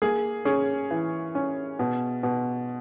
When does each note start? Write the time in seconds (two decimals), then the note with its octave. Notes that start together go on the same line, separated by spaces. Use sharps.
0.02 A#3 G#4
0.45 C#4 G#4
0.91 E3
1.35 C#4
1.79 B2
2.23 B2